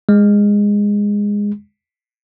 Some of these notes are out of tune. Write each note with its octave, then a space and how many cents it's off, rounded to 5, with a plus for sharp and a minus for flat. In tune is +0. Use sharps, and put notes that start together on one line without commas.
G#3 -15